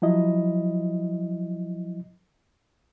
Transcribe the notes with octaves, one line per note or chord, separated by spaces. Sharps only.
F3 F#3 E4 D#5